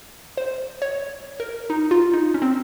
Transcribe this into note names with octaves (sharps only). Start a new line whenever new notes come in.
C5
C#5
A#4
D#4
F4
D#4
C#4
C4